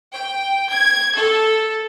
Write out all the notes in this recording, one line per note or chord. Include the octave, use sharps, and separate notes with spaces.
G5
G#6
A4